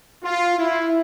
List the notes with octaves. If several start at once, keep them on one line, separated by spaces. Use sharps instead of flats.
F4
E4